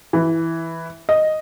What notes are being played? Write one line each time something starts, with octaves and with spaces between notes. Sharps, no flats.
E3
D#5